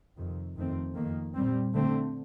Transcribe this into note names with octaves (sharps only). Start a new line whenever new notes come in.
F2 C3 D#3
F2 D#3 A3 C4
F2 D#3 A#3
A#2 G3 C4
D3 A3 C4